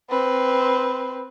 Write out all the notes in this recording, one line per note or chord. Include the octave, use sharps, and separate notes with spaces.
C4 B4